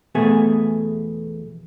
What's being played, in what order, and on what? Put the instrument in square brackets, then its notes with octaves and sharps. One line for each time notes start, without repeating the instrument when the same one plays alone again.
[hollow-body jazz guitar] E2 B2 A3 G#4